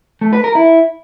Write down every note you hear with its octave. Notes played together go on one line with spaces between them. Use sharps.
A3
B4
A#4
E4